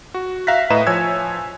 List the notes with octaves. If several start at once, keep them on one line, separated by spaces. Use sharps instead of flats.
F#4
E5 F5 A#5 F#6 A#6 B6
A2 B4 D#5 E5 A#5 E7
F3 C#5 G#5 E6 G#6